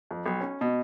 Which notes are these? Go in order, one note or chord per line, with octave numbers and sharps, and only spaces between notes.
F2
B1
C#4
B2